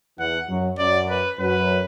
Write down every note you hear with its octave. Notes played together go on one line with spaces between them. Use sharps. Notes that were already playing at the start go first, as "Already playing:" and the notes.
E2 E3 F#5
F#2 F#3
F#2 F#3 D5
B4
F#2 F#3 B4